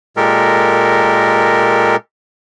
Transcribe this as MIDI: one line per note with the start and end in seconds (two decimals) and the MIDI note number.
0.17 1.96 46
0.17 1.96 56
0.17 1.96 67
0.17 1.96 69
0.17 1.96 70